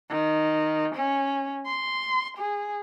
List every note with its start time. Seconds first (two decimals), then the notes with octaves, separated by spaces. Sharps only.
0.10 D#3
0.95 C#4
1.66 C6
2.38 G#4